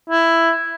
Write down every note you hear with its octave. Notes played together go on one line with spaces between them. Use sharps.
E4